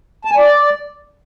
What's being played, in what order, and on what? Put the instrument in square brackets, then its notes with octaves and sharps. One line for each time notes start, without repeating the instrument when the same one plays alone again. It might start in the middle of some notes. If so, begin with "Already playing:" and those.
[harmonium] A5
G#5
D5